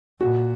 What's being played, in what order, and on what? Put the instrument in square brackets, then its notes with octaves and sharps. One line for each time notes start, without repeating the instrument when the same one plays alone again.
[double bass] A#2 [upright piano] F#4